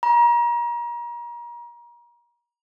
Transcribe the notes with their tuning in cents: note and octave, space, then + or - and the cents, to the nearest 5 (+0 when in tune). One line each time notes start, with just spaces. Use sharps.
A#5 +35